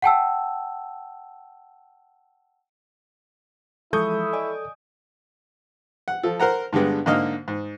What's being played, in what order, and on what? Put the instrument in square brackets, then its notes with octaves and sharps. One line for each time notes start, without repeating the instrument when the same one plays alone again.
[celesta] F#5 G5 A5 E6
[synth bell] E3 F3 G#3 [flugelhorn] E4 [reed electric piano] A4 [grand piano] C#6 D#6 G6
[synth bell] D5 D#5 G#5
[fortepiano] F#5
F3 A4
A#4 C5 F#5 A#5
G2 D3 G3 G#3 B3
G#2 D3 A#3 D#5 D#6 F6
G#2